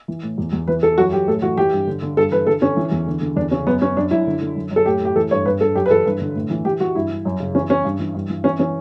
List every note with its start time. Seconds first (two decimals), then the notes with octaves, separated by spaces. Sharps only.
0.08 E3
0.23 A2
0.38 E2
0.53 E2
0.68 E3 B4
0.82 E3 A4
0.98 F#2 F#4
1.12 F#2 G4
1.27 A2 A4
1.42 E3 F#4
1.57 E3 G4
1.72 G2
1.87 D3
2.02 D3
2.17 G2 A4
2.32 E3 B4
2.47 D3 A4
2.62 D3 C#4
2.76 E3
2.91 E2
3.07 D3
3.21 D3
3.36 E2 D4
3.51 C#3 C#4
3.66 F#2 B3
3.81 F#2 C#4
3.97 F#2 D4
4.11 F#2 E4
4.26 D3
4.42 D3
4.56 F#2
4.71 F#2
4.76 A4
4.86 A2 G4
5.01 A2 G4
5.16 E3 A4
5.31 G2 C#5
5.46 G2 B4
5.61 G2 A4
5.75 F#2 G4
5.86 B4
5.90 E3 A4
6.05 G2 B4
6.20 D3
6.35 A2
6.50 E3
6.65 E3 G4
6.80 E3 F#4
6.95 G2 E4
7.10 G2
7.25 F#2
7.40 C#3
7.55 E3 C#4
7.70 E3 C#4
7.85 G2
7.99 E3
8.14 G2
8.29 E3
8.44 E3 C#4
8.59 E3 C#4